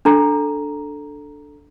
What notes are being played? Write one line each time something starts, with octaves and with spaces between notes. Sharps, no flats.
D4 A4 A#5